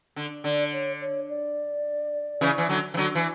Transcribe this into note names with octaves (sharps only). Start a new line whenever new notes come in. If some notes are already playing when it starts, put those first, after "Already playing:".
D3
D3 D5
C#5
C#5
D5
C#3 E3
E3
D3 F#3
E3
D3 F#3
E3